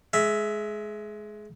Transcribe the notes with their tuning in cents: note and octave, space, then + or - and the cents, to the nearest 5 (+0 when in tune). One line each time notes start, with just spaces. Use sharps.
G#3 +20 E5 +0